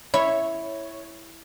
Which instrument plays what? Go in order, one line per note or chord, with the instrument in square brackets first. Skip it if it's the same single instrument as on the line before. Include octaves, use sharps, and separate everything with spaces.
[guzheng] E4 [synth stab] C#5